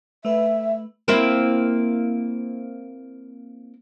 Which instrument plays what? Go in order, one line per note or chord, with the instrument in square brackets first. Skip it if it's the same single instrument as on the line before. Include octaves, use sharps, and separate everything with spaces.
[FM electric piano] A3 B4 [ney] E5
[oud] A#3 C4 E4